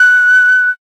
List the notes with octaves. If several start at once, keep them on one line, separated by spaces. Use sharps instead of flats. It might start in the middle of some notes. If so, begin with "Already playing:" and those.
Already playing: F#6